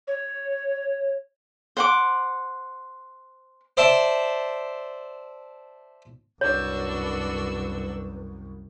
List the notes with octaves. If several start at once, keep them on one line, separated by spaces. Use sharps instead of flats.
C#5
C5 F#5 D6
C5 D5 E5 A5 C6
C2 F#2 D4 F#4 B4 C#5 E6